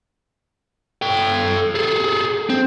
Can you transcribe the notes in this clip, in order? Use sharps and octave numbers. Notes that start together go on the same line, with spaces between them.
A4 G5
G#4 A4
C4